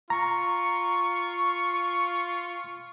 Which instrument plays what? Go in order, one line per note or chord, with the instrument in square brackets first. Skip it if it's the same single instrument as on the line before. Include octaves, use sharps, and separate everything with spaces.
[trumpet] F4 [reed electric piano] A#5 [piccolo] C#6